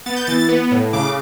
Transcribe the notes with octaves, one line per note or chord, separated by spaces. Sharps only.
B3 A6
G6
E3 A6
A6
B3
A2
C#3 D6